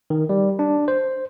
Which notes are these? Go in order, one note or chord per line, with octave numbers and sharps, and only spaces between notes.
D#3
G3
D4
C5